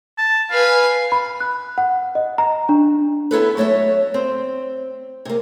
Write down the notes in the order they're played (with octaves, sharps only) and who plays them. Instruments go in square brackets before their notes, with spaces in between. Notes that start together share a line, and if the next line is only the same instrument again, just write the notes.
[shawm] A5
[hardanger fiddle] B4 G#5 [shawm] F5
[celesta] B5
F#6
F#5
D#5
A#5
D4
[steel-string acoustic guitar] B3 E4 A4 B4
F#3 A3 C#5 D#5 E5
C4
C3 A#3